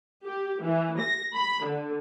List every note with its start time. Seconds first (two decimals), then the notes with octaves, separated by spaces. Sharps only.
0.23 G4
0.62 E3
0.98 A#6
1.34 B5
1.66 D3